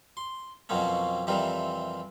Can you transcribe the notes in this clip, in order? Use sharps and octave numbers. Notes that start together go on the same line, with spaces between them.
C6
F2 B2 F#3 A#3 C4 C#4
F2 C3 E3 G3 C4 A#4